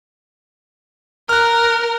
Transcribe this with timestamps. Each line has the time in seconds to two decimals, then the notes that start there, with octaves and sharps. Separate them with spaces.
1.29 A#4 F6 F#6